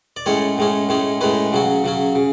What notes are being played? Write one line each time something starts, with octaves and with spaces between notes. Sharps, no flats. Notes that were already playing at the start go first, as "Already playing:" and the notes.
D5
A2 G#3 C#4 C#5
A2 G#3 C#4
A2 G#3 C#4
A2 G#3 C#4 B4
C#3 F#3 C#4
C#3 F#3 C#4
C#3